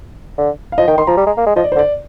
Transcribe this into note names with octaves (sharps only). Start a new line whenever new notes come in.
D3
F5
F3 D#5
D#3 G5
D#3 C6
F3 A#5
G3
G#3
A#3
G#3
F3 D#5
D5
C5
D3
D5